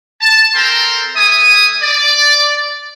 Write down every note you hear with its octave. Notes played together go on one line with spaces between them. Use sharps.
A5
C4 A4 A#4 G5 A#5 C6
A3 E5 G#5 D#6
D5